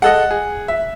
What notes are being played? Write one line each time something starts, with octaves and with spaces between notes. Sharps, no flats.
G#3 A4 D#5 F#5
G#4
E5